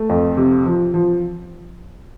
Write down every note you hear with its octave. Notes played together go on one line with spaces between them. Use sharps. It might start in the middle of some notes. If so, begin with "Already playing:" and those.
Already playing: A3
F2
C3
F3
F3